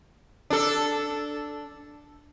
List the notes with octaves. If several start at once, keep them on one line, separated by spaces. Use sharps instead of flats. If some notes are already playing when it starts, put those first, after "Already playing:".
D4 A4